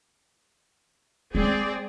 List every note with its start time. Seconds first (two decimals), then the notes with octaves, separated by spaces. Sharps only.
1.35 G#3 C4 G#4 D5